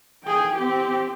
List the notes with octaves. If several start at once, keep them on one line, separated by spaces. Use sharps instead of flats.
G#4 G5
C4 G4